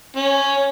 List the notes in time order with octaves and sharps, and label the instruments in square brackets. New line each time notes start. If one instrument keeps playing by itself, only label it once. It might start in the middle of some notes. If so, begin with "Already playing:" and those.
[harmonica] C#4